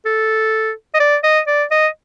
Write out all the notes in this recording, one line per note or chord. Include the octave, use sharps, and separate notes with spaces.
A4
D#5
D5
D#5
D5
D#5